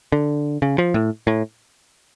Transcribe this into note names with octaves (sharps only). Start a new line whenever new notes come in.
D3
C#3
F3
A2
A2